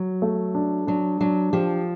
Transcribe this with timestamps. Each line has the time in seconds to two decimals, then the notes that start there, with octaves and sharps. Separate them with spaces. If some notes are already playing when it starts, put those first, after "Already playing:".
Already playing: F#3
0.22 A3
0.55 D4
0.87 F#3 D4
1.21 F#3 D4
1.53 F3 G4